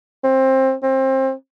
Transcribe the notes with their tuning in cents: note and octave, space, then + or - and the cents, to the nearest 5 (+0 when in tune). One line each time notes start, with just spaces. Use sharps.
C4 +20
C4 +25